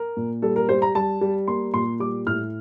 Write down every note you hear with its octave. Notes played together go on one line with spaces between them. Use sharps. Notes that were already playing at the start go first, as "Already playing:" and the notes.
Already playing: A#4
A#2
G3 A4
A#4
G3 C5
A#5
G3 A5
G3
A#3 C6
A#2 C6
G3 D6
A2 F6